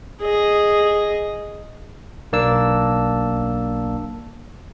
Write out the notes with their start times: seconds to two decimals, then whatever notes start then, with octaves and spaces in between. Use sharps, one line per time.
0.21 G#4 D#5
2.33 B1 A#3 D4 A5 E6